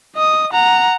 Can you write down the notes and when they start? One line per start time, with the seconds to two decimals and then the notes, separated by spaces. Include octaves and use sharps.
0.16 D#5 D#6
0.52 F#5 A#5